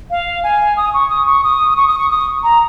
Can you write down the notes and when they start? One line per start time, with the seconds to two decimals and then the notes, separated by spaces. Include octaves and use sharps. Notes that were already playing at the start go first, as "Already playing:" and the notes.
0.11 F5
0.44 G#5
0.77 D#6
0.94 C#6
1.10 D#6
1.27 C#6
1.44 D#6
1.77 C#6
1.88 D#6
1.98 C#6
2.10 D#6
2.43 A#5